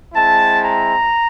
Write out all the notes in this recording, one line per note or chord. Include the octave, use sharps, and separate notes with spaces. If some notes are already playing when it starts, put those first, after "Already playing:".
G#3 C4 E4 A5
A#5